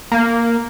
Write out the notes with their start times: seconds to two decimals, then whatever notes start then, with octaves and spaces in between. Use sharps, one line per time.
0.12 A#3